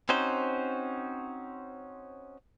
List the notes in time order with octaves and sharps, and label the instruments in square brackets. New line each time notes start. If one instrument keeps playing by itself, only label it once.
[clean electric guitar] C4 C#4 D#4 F#4 C5